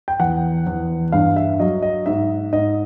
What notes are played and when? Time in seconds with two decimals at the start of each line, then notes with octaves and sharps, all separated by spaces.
0.08 G5
0.20 E2 F#5
0.67 E2
1.12 G2 F5
1.36 E5
1.60 F#3 D#5
1.82 D#5
2.06 G#2 E5
2.52 G#2 D#5